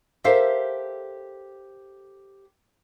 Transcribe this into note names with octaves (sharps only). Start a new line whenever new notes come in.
G4 A4 A#4 C5 E5 F5